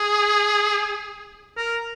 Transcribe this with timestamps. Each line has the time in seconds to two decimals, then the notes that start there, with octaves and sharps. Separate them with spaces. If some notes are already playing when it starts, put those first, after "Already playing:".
Already playing: G#4
1.57 A#4